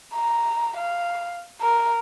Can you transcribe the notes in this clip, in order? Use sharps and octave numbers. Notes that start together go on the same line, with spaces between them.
A#5
F5
A#4